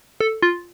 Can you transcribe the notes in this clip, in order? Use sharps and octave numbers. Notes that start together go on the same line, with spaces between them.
A4
F4